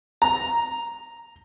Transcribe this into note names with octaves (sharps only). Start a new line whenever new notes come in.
A#5